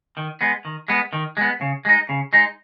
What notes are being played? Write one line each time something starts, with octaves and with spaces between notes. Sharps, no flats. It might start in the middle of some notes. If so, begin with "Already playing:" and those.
D#3
G#3 B3
D#3
G#3 B3
D#3
G#3 B3
C#3
G#3 D#4
C#3
G#3 D#4